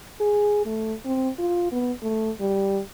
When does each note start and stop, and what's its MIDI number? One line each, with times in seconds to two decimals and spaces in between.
0.21 0.62 68
0.66 0.94 57
1.06 1.30 60
1.39 1.68 65
1.72 1.92 59
2.02 2.31 57
2.40 2.81 55